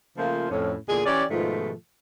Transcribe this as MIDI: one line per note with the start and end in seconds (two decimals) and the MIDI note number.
0.17 0.48 49
0.17 0.48 53
0.17 0.48 57
0.17 0.48 58
0.17 0.48 65
0.17 0.48 72
0.51 0.74 41
0.51 0.74 45
0.51 0.74 61
0.89 1.01 40
0.89 1.01 46
0.89 1.01 50
0.89 1.01 68
1.06 1.25 52
1.06 1.25 61
1.06 1.25 67
1.06 1.25 74
1.31 1.73 44
1.31 1.73 47
1.31 1.73 51
1.31 1.73 53
1.31 1.73 57
1.31 1.73 65